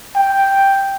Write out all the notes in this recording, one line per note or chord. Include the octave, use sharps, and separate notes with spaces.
G5